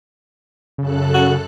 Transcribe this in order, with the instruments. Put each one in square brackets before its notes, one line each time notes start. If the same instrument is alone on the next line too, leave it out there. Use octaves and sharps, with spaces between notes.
[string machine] F#2 A4 F#6 [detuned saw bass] C#3
[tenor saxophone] F#4